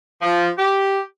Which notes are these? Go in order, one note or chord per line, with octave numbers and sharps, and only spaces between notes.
F3
G4